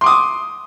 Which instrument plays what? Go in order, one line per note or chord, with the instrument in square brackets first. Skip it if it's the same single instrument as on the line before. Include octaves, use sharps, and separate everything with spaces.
[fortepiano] C6
D6
D#6